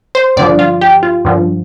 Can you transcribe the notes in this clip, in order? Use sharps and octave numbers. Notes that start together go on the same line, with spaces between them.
C5
G2 D3 F3 D5
F4
G4
F4
G2 D3 F3